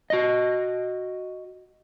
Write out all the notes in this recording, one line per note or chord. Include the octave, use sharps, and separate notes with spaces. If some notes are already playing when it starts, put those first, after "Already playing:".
F#4 D#5